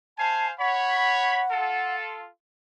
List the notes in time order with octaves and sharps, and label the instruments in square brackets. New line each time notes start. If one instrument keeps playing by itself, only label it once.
[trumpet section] C5 F5 G#5 [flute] A5
[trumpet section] C#5 B5 [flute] F#5
[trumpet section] F4 A4